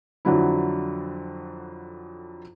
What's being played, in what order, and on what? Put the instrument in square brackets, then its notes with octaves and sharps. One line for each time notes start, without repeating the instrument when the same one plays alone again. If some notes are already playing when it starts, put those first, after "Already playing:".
[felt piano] F2 D3 F#3 E4